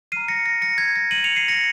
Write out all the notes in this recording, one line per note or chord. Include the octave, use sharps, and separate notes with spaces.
A#5 F6 C7 D#7
A#6 C#7
A#6
A#6 C#7
G#6
A#6
D#7 F#7
C#7 F7
C7 D#7
A#6 C#7